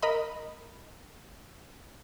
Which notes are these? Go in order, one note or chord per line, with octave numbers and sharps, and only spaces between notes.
A#4 D#5 B5